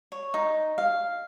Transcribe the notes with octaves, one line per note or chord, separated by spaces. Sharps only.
C#5
D#4
F5